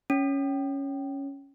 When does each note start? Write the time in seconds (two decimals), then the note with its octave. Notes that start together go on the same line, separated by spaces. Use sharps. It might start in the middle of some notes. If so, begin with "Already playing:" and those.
0.10 C#4